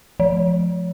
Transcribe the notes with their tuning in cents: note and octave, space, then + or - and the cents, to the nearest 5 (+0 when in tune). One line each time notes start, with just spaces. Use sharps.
F3 +5